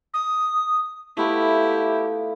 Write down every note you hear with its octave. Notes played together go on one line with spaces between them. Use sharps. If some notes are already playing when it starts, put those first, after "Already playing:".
D#6
A3 B3 E4 F4 G4